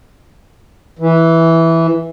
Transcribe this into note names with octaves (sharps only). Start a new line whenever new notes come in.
E3